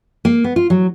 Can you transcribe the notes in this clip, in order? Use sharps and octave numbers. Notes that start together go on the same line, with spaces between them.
A#3
B3
F4
F#3